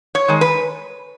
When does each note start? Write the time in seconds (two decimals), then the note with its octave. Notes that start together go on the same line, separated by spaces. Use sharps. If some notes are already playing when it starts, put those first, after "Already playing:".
0.15 C#5
0.28 D#3 G#3
0.41 B4